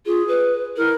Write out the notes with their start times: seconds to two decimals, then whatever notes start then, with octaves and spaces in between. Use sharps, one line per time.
0.06 F4 G#4
0.28 B4
0.77 E4 A#4